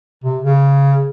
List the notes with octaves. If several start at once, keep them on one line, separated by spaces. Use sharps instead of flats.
C3
C#3